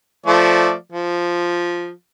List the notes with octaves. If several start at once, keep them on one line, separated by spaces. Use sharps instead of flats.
F3 A3 D5
F3